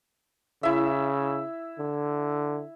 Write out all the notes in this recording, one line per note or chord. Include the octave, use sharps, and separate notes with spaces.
C#3 E4 E5
D3